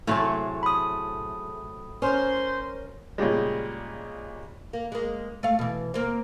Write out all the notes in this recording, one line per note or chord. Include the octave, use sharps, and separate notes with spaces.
A2 C3 F#3 A3 G#4 A5
B5 D#6
C#4 A#4 C5
A#2 C#3 G3 G#3
A#3
G#3 A#3
A3 F5
B2 E3
A#3 C4